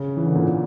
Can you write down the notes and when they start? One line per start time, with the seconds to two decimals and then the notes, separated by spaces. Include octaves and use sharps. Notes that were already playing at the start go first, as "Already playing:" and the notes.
Already playing: C#3
0.17 E3
0.26 D3
0.35 A#2